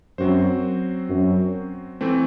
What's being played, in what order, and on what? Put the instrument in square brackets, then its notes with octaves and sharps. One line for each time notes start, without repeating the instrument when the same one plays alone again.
[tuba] F#2 [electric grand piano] F#3 C4 F#4 C5
[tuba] F#2
[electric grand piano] E3 A3 C4